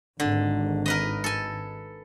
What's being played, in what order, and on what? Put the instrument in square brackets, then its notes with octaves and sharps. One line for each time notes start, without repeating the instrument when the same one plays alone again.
[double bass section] G#1 [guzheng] D3
[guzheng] A#4 B4 D#5
A4 G#5